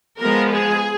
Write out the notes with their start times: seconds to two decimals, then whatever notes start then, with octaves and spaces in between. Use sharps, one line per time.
0.20 F3 G#3 B3 A#4
0.52 G#4